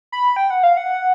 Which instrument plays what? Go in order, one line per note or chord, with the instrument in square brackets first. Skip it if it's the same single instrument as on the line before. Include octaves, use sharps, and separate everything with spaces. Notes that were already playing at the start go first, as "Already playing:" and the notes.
[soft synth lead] B5
G5
F#5
F5
F#5